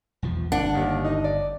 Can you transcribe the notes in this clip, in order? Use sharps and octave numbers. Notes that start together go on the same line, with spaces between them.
B1 E2 F3
G1 D4 F#5
D#2
D#4 D#5
D5